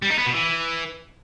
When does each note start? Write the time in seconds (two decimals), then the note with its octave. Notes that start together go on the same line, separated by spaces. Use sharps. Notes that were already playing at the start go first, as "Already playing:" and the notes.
0.02 G3
0.10 D#4
0.18 B3
0.26 B2
0.34 E3